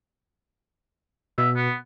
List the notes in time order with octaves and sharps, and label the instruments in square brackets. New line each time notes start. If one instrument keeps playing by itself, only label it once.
[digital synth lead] B2 [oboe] E5
[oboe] B3